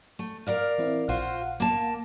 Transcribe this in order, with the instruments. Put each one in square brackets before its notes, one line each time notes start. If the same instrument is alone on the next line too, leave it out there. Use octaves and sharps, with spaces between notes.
[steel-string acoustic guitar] A3
A#4 D5 F5
[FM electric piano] E3 C4 E4
[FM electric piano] A#1 F5 F#5 [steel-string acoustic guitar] F4 F#4 C5
[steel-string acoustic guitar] A#3 A5